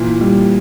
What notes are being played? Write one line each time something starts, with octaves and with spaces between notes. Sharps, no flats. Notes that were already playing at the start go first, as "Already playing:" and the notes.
Already playing: A#2 E3
G3